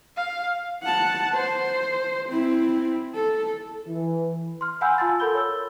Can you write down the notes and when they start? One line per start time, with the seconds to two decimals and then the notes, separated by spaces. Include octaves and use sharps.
0.16 F5
0.83 F#5 A5
1.35 C5
2.30 C4 E4
3.14 A4
3.87 E3
4.61 C6 F6
4.81 F5 F#5 G#5 B5 E6 G6
4.98 F4 G#5 A5 C6 E6 A6
5.20 A4 A#4 B5 G6 G7
5.34 C#5 E6